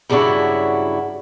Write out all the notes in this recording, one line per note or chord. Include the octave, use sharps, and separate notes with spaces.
G2 C#3 F#3 D4 E4 F#4